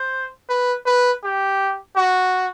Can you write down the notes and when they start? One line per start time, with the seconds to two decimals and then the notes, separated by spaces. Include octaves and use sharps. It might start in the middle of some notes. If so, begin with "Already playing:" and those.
Already playing: C5
0.49 B4
0.86 B4
1.24 G4
1.97 F#4